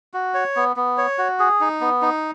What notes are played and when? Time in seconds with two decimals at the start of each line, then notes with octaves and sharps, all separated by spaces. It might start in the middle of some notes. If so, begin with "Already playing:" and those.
0.14 F#4
0.34 C#5
0.56 B3
0.76 B3
0.98 C#5
1.18 F#4
1.39 G#4
1.61 D#4
1.81 B3
2.02 D#4